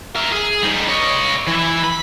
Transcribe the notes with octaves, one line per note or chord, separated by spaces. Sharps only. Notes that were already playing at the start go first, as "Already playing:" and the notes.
A#4 E5
G#4
G3 D#4
C#5 D#5
E3 E4
B5